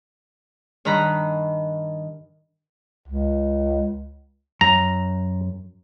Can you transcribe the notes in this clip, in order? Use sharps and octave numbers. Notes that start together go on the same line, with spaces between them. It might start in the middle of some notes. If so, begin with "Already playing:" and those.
G2 D#3 A#5 B5 F#6
C#2
F#2 A#5